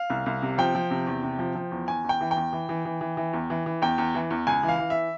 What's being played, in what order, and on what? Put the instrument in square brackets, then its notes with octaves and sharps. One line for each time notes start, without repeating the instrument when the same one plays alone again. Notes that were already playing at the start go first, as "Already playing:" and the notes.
Already playing: [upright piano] F5
C2
C2
C3
F3 G5
F3
C3
E2
C3
F3
F3
E2
E2 G#5
E2
G5
E3
G5
E2
E3
E3
E3
E3
E3
E2
E3
E3
E2 G5
E2
E3
E2
C#2 G#5
E3
F5
E3
E5